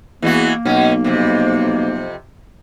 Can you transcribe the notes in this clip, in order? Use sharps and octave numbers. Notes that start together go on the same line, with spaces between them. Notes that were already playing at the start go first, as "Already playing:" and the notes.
E2 E3 G#3 A#3 F#4
B1 B2 C#4
F2 C3